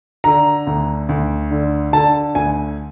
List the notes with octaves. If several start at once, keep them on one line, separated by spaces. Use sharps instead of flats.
D3 A#5
D2
D2
D3
D3 A5
D2 G#5